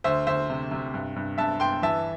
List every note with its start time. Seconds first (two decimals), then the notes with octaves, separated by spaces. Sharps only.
0.04 D2 C5 E5
0.27 D2 C5 E5
0.50 C3
0.71 C3
0.94 G2
1.16 G2
1.38 G2 E5 A5
1.60 G2 G5 C6
1.82 E3 E5 A5